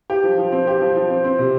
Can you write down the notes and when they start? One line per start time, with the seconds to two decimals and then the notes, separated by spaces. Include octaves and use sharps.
0.10 G4
0.24 F3
0.38 F3
0.52 C4
0.67 G4
0.81 F3
0.96 F3
1.10 C4
1.24 C4
1.39 C3